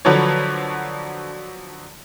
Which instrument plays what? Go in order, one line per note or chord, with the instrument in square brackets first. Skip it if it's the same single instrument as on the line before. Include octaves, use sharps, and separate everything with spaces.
[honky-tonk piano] D3 F3 F#3 B4 C#5